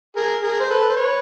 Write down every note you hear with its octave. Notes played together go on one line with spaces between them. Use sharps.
G#4 A#4
G#4 A#4
C5
A4 B4
B4
C5
B4 C#5